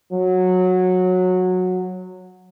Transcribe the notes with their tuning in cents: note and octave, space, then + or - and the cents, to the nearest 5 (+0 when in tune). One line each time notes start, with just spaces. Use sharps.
F#3 -15